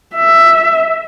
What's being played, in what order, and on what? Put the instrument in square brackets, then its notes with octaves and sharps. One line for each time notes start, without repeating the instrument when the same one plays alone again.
[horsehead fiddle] E5